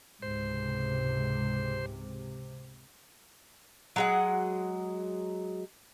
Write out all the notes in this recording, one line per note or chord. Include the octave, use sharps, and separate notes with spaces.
C#2 G#2 C3 C5
F#3 G#3 F#5